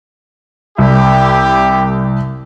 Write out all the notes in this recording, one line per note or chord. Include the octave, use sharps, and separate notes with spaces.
C2 E4 G4